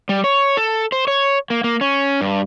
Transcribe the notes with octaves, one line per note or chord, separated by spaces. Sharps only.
G3
C#5
A4
C5
C#5
A#3
A#3
C#4
G2